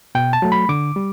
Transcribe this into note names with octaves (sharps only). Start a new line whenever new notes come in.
B2 G5
A5
F#3 A3
B5
D3 D6
G3